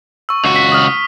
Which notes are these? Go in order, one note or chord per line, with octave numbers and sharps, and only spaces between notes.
C#6 E6
C#2 F#4
B6
D#6 F6